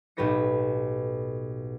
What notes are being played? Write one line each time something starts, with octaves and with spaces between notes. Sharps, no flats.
B1 A2 G4 B4 A#6 C#7